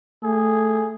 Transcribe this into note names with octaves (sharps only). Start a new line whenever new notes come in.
A3 G#4